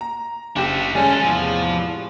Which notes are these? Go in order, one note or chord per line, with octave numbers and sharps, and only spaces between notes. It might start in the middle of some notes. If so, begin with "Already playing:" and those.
A#5
F#1 D4 G4 E5
D#3 G3 G#3 C#4 A4 G#5
E2 A2 C3 F3